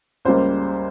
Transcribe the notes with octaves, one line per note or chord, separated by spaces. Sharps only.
C#2 C#3 G3 A#3 C5